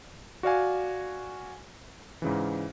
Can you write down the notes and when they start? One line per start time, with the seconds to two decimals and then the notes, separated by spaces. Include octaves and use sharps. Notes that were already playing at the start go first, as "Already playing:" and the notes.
0.43 F#4 D5 F5 G#5
2.22 G#2 C#3 E3